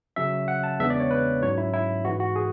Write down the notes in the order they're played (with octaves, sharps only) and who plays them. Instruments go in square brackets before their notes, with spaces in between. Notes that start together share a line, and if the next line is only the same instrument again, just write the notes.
[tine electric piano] C#3 F#3 C#4 E5
F#5
A5
E2 C#3 G#3 B3 D4 E5
D5
C#5
B4
G#2 F#3 C#4 C#5
E4
E4
G#2 E3 G#3 F#4
F#4
G#4